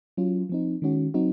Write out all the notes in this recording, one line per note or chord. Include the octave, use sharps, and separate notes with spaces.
F#3 C#4 F4
F3 C4 D#4
D#3 G#3 C#4 F#4
F#3 C4 D#4 F#4